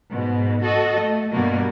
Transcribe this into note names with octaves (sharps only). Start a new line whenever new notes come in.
G#2 B2
F#4 A4 D#5
A3
G2 B2 G3 A#3 F#4